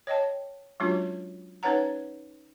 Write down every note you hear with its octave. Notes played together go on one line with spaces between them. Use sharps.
C#5 D#5 G5 A5
F#3 G#3 C#4 D4 F4 F#4
C#4 D#4 B4 C#5 F#5 A#5